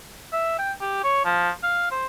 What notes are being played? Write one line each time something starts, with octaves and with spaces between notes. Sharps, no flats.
E5
G5
G4
C#5
F3
F5
C5